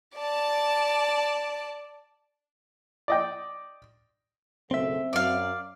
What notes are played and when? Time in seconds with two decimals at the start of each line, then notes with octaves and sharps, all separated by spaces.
0.16 D5 A5
3.08 D5 D#5 G5
4.71 F#1 B1 A3 C4 E5
5.13 F#2 D5 F5